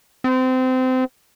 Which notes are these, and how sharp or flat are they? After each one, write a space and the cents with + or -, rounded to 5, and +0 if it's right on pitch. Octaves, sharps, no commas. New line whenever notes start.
C4 -25